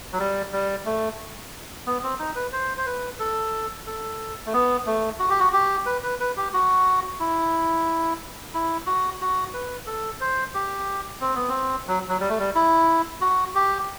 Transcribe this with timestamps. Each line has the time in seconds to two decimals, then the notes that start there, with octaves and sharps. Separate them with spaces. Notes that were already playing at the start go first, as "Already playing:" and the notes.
0.12 F#3
0.19 G3
0.52 G3
0.86 A3
1.86 B3
2.03 C4
2.19 D#4
2.36 B4
2.52 C5
2.77 C5
2.86 B4
3.20 A4
3.87 A4
4.46 A3
4.54 B3
4.86 A3
5.19 F#4
5.29 G4
5.40 F#4
5.53 G4
5.86 B4
6.03 B4
6.20 B4
6.37 G4
6.53 F#4
7.20 E4
8.54 E4
8.86 F#4
9.21 F#4
9.54 B4
9.87 A4
10.21 C5
10.54 G4
11.21 C4
11.35 B3
11.49 C4
11.88 F#3
12.09 F#3
12.20 G3
12.29 A3
12.39 G3
12.55 E4
13.21 F#4
13.55 G4